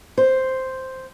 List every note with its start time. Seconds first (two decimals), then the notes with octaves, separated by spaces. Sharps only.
0.18 C5